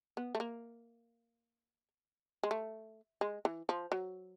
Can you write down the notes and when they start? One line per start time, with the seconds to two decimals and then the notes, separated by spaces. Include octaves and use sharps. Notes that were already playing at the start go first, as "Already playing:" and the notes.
0.17 B3
0.35 A3
0.40 A#3
2.43 G#3
2.51 A3
3.21 G#3
3.45 E3
3.69 F3
3.92 F#3